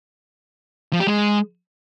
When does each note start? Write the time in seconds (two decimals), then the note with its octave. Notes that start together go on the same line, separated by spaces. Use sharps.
0.93 F3
1.00 G4
1.07 G#3